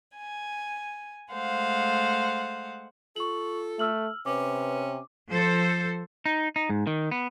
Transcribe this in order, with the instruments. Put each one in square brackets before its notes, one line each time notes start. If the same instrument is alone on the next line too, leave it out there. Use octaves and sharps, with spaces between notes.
[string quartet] G#5
G#3 A3 C5 F5 F#5
[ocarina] F4 [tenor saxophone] A4 [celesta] C#6 F#7
[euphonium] A3 [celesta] E6 F6 F#7
[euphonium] C3 [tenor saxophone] C#4 [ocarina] B4 [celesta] D6
[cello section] F3 A4 C5
[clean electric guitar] D#4
D#4
G#2
D#3
B3